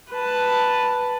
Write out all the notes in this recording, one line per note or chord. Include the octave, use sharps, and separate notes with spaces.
B4 A5